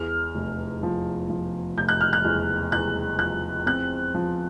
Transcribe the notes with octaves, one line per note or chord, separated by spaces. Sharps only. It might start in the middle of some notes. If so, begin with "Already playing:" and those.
Already playing: E2 F6
F1
F3
F3
F1 G6
F#6
F6
F#6
E2
E2 F#6
F3 F#6
C4 F#6
F3